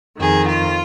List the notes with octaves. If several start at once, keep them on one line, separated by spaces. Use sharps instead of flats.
F2 D#3 G#4
F4